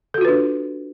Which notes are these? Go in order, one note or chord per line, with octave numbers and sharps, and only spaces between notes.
D4 F4 F#4 A4 B4